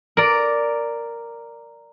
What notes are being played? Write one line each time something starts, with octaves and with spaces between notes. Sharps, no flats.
A#4 D5